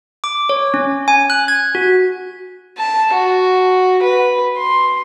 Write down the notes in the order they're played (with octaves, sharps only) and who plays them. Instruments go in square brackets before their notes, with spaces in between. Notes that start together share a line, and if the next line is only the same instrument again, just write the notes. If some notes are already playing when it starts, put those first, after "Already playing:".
[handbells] D6
C#5
C#4
G#5
F#6
G#6
F#4
[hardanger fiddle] A5
F#4
B4
C6